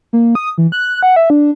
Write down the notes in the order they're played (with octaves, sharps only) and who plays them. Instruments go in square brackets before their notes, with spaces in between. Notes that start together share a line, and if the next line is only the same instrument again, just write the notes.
[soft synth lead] A#3
D#6
E3
F#6
F#5
E5
D4